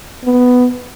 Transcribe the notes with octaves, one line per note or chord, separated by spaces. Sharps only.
B3